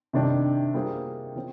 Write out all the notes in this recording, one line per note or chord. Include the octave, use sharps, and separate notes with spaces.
C3 D#3 G3 D4
G3 A#3 F4 G#4 C5
F3 C4